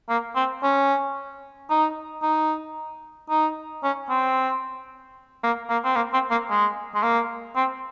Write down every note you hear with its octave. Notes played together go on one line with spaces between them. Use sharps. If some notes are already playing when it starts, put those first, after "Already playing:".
A#3
C4
C#4
D#4
D#4
D#4
C#4
C4
A#3
A#3
C4
A#3
C4
A#3
G#3
G#3
A#3
C4